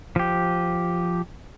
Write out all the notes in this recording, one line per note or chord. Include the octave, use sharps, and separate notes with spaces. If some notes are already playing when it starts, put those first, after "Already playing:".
F3 G4